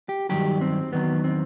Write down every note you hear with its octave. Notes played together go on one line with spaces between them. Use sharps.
G4
G2 D#3 F#3 G4
C4
E2 D#3 F#3 B3
C4